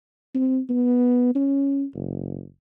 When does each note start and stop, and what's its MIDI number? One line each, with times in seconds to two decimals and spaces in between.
0.34 0.60 60
0.69 1.33 59
1.35 1.85 61
1.94 2.45 30